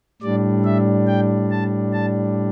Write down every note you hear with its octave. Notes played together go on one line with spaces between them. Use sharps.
A2 G3 D4 D5
E5
G5
A5
A5